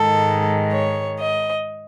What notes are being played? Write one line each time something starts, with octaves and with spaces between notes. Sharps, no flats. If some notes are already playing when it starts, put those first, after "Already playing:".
Already playing: G#2 D#3 G#3 A4
C#5
D#5